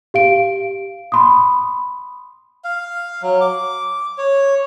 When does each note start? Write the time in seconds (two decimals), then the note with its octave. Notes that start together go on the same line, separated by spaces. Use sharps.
0.14 G4 F5 D7
1.12 B5 C6 D#6
2.64 F5
3.22 F#3
3.41 D6
4.18 C#5